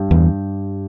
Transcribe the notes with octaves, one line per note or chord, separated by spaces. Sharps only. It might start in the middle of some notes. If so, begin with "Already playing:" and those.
Already playing: G2
E2